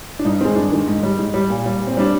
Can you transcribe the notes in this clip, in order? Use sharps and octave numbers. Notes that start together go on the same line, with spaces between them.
D4
G2 D#4
D#3 G#3 C4
G2 D4
D#3 G#3
G#2
G3
G#2
G3
A#2
G3
A#2
C4
G3 D4